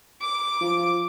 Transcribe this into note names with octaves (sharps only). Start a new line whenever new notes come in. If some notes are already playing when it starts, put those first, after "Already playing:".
D6
F3